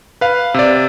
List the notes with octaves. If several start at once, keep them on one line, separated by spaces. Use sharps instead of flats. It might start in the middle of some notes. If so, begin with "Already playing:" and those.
B4 F5
C3 D5